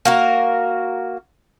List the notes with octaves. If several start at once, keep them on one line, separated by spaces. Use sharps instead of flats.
A#3 F#4 A#4